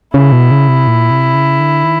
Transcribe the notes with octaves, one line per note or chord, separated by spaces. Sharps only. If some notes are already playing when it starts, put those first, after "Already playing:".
C#3 E4
B2
C#3
C3
A#2
C3
C#3
D3
D#3